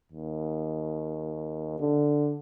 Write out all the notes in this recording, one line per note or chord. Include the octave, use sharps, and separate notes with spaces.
D#2
D3